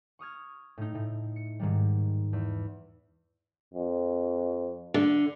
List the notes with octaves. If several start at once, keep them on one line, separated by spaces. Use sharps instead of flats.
C#6 D#6 F6 G#6
A2 A3 D#4
A2
C#7
G#2 D#3 G3
E2
F2
D3